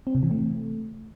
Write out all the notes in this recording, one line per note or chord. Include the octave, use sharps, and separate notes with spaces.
C4
C3
E3
A3